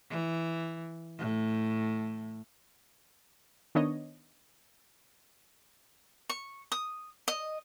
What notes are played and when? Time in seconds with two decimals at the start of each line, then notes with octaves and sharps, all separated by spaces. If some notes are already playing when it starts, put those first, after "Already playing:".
0.10 E3
1.18 A2
3.75 D#3 B3 D4 C#5 D#5
6.30 C#6
6.72 D#6
7.28 D#5